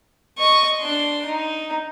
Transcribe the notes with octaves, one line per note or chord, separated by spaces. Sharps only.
D#5 C#6
D4 C6
D#4